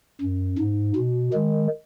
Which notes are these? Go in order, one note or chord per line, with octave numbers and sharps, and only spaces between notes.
F#2
G#2
B2
D#3 G#3